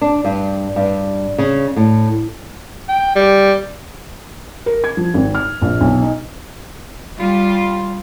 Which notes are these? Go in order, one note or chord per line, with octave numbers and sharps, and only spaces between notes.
D4
G2
G2
C#3
A2
G5
G3
A#4
G#6
F3
G#1
F6
A#1
B1
D#4
G3 F4